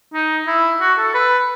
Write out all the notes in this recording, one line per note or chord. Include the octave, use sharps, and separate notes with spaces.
D#4
E4
F#4
A4
B4